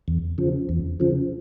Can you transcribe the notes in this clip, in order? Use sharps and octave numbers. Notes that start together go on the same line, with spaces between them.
E2
C#3 F3
E2
C#3 F3